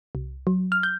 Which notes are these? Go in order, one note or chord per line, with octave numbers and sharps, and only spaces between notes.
C2
F#3
F6
G6